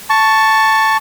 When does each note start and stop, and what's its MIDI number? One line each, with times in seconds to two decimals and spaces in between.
0.10 0.97 81
0.10 0.97 85